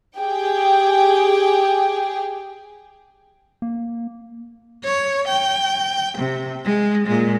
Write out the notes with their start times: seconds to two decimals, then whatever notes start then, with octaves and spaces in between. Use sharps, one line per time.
0.18 G4 G#4 G5
3.62 A#3
4.84 C#5
5.28 G5
6.18 C3
6.65 G#3
7.07 A#2 G#3